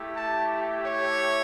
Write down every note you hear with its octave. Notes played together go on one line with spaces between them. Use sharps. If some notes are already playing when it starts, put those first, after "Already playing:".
Already playing: A3 E4 G4
A5
C#5